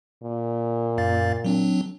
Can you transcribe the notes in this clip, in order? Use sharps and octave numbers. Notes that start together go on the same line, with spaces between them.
A#2
F#2 F5 A6
F#3 C4 D4